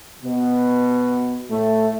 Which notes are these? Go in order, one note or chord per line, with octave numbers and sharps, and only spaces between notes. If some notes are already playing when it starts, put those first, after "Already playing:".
B2 B3
A2 A3